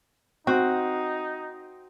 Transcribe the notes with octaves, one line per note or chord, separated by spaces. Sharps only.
C4 D#4 F#4